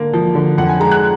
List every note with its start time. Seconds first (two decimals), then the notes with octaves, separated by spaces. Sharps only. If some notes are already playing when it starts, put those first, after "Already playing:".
Already playing: D3 A#3
0.13 F3
0.35 D3
0.58 F2 F#5
0.69 G#5
0.80 G#3 A#5
0.91 F#6